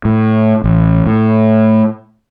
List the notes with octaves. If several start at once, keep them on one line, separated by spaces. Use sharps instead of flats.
A2
A1
A2